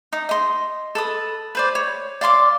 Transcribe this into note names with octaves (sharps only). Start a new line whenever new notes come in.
D#4 D#6
D#5 C6
A4 B4 D#6
B4 C5 D5
C#5
D5 F5 C6 D6